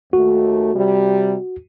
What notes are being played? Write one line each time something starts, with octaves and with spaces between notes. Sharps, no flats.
D#2 A3 F#4
C3 G3